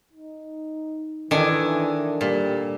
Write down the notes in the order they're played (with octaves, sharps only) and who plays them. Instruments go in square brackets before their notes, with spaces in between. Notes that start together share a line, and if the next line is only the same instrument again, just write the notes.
[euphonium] D#4
[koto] D#3 G#5 [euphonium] E3 [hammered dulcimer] D4 A4
[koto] A#2 [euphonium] G3